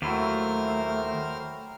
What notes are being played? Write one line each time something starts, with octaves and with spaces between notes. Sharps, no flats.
D#2 F#3 A3 E4 G4 A#4 C5 F6